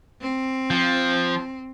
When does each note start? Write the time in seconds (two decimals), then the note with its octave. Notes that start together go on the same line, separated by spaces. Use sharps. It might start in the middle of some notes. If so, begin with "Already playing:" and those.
0.21 C4
0.71 F3